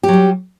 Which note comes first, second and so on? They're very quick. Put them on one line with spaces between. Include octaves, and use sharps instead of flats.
G4 F#3 G3